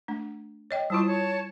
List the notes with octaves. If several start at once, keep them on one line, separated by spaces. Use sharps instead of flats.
A3 D4
C#5 D#5 G5
G3 E4 F4 C5 A5 D#6
C#5 A5